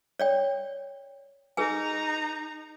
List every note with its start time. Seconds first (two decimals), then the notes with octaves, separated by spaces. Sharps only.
0.19 C#5 D5 G5
1.57 D#4 G#4 B4 G#5 A#5